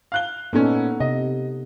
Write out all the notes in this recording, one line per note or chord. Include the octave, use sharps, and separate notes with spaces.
F5 F#6 G7
A#2 B3 C#4 D#4 A4
C3 D#5